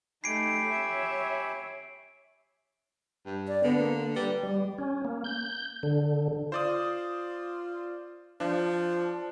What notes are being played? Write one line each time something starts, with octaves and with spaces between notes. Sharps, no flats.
A3 D#4 G4 G#5 B5 C7 D7
C#5 E5
G2
D5
D3 B3
A#3
G3 B4
G3
C#4
A#3
G6
D3
F4 C5 D5 D#6
F3 D4